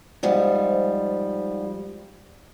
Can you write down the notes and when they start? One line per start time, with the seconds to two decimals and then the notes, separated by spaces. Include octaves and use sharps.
0.23 G#2 F3 G3